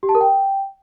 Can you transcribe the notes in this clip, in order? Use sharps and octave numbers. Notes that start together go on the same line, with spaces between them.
G4
A5
A#4
G5